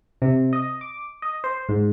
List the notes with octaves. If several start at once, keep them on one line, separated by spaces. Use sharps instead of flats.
C3
D#5
D6
D#5
C5
G#2